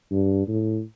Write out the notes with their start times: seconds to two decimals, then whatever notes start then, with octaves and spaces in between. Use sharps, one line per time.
0.11 G2
0.48 A2